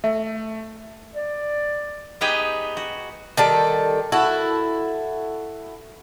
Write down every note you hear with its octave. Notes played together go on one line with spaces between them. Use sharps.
A3 E5
D5
B3 D#4 G4 G#4 B4 G5
F#4
D#3 G3 A4
E4 F#4 A4